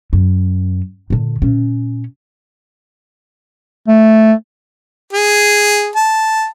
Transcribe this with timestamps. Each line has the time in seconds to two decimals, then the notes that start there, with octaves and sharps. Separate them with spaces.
0.13 F#2
1.10 A#2 D3
1.42 A#2 C#4
3.88 A3
5.13 G#4
5.96 A5